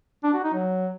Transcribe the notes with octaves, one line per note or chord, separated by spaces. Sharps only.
D4
F#4
D#4
F#3